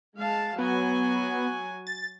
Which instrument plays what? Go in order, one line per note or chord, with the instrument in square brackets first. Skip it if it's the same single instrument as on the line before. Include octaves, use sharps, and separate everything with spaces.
[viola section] G#3 F5 A5
[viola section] F#3 F#4 G#5 [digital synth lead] B3
[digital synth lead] A6